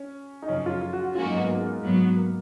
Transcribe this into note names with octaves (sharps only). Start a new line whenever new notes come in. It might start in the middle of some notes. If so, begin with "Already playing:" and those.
Already playing: C#4
D#4
F#2 C#3 F3 C#4
F4
F4
F#4
F#4
G#2 F#3 A#3 C#4 F4 F#4
D#4
B3
A#3
G#3
A#3
G#2 F#3 B3
A#3